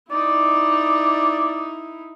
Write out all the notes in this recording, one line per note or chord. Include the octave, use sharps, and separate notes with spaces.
D#4 E4 D5